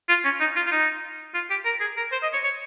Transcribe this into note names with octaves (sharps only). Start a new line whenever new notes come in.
F4
C#4
D#4
F4
F4
D#4
F4
G4
A#4
G#4
A#4
C5
D#5
C#5
C#5